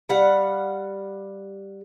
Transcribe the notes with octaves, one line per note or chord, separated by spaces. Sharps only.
G3 F5 F#5